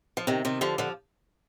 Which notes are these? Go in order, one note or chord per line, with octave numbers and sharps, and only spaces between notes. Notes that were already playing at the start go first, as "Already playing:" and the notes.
F3
C3 D#3
C3 D#3
D3 F3
D3 F3